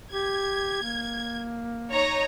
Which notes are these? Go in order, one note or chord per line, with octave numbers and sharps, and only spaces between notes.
G4 G#6
A#3
D#4 C#5 A#5